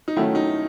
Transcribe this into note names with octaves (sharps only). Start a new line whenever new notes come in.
D#4
D#3 F#3 A3 C#4 E4
D#4